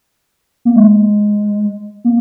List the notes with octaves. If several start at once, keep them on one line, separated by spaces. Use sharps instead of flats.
A#3
G#3
A#3